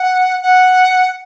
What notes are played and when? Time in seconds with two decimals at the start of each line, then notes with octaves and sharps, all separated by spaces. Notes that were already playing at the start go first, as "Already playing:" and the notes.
Already playing: F#5
0.43 F#5